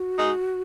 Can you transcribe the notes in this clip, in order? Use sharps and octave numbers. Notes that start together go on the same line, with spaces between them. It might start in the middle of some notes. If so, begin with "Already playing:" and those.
Already playing: F#4
G#3 D#4